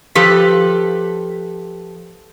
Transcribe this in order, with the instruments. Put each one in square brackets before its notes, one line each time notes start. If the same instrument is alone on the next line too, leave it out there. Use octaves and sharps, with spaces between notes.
[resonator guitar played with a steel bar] F3 G4 A4 B4